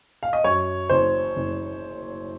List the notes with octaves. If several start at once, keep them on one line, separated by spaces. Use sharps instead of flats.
F5
D#5
F#2 C#5
F#1 C5
F#1